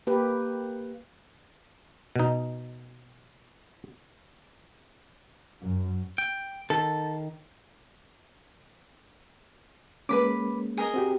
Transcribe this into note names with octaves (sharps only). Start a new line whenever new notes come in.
A#3 G4 B4
B2 D#4
F#2
G5
D#3 A4
G#3 A#3 C#4 B4 B5 D6
G#4 A#4 D#5
C4 F#4 G4